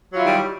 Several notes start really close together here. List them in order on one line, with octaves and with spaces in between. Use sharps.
F#3 F4 E4 D#3 G3